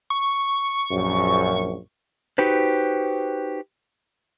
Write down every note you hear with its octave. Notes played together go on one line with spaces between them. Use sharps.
C#6
A#1 F#2
D#4 F#4 G4 B4 C5